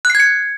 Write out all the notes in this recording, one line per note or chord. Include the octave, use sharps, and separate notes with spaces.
F#6 G#6 C7 C#7